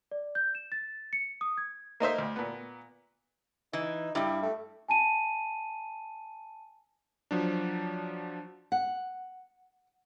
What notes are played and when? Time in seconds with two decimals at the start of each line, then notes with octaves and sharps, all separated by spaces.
0.12 D5
0.35 G6
0.55 E7
0.72 A6
1.13 C#7
1.41 D#6
1.58 G#6
2.00 A#3 D#4 C5 E5
2.18 D2
2.36 A#2 B3
3.73 E3 D#4
4.15 G2 G3 E4
4.42 A3
4.89 G#5 A5 D#7
7.31 F3 F#3 D4
8.72 F#5